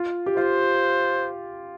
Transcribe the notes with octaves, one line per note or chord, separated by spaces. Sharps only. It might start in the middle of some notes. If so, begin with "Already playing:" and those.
Already playing: F4
G4
F4 C5